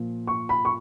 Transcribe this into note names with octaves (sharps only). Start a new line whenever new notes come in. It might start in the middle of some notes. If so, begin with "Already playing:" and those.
Already playing: A#2 F3
C#6
B5
C#6